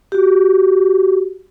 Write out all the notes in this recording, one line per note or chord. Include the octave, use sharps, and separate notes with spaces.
F#4 G4